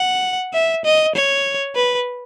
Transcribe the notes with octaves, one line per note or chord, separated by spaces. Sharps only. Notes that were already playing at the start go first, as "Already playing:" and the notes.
Already playing: F#5
E5
D#5
C#5
B4